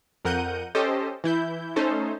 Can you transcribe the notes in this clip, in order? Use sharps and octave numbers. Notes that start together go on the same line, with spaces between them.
F2 A#4 F#5 G6 D#7
C#4 G4 A4 C5 D#5
E3 E4 G6
A3 C#4 D#4 A4 C5